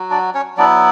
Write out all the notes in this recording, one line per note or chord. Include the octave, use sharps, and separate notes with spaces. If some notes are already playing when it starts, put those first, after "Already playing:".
Already playing: F#3 F#4
D4 D5
C#4 C#5
F#3 B3 D4 E4 D5